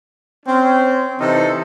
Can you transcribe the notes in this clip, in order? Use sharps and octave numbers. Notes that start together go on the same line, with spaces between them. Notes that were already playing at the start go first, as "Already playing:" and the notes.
C4 C#4
C3 E3 D#4 A4